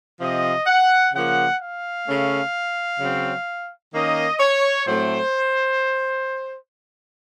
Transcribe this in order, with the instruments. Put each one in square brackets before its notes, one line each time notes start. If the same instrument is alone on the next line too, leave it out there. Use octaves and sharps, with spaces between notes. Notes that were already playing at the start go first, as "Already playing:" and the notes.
[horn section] C3 F3 C4 D#5
F#5
C#3 F3 A#3 F#5
F5
C#3 A3 C#4
C#3 F#3 C4
D#3 A#3 C#4 D#5
C#5
A2 F#3 A3 C4 C5